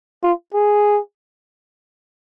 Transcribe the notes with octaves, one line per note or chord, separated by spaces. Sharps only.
F4
G#4